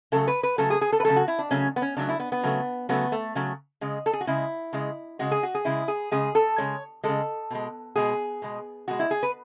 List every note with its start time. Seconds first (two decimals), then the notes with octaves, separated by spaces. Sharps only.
0.12 C#3 F#3 A3 A4
0.28 B4
0.43 B4
0.58 C#3 F#3 A3 A4
0.70 G#4
0.81 G#4
0.93 A4
1.00 B4
1.05 C#3 F#3 A3 A4
1.16 F#4
1.28 E4
1.39 D4
1.51 C#3 F#3 A3 C#4
1.76 B3
1.82 C#4
1.97 C#3 F#3 A3 D4
2.09 E4
2.20 B3
2.32 B3
2.43 C#3 F#3 A3
2.89 C#3 F#3 A3 B3
3.12 A3
3.35 C#3 F#3 A3
3.81 C#3 G#3
4.06 A4
4.13 G#4
4.21 F#4
4.27 C#3 G#3 E4
4.73 C#3 G#3
5.19 C#3 G#3 F#4
5.31 G#4
5.43 F#4
5.55 G#4
5.65 C#3 G#3 E4
5.88 G#4
6.12 C#3 G#3 G#4
6.35 A4
6.58 C#3 G#3 C#5
7.04 C#3 G#3 A4
7.50 B2 G#3
7.96 B2 G#3 G#4
8.42 B2 G#3
8.88 B2 G#3 F#4
8.99 E4
9.11 G#4
9.23 B4